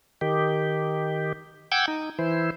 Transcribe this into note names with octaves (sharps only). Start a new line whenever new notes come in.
D#3 G4
F#5 G5 D6 E6 G6 G#6
D#4
E3 E4 C5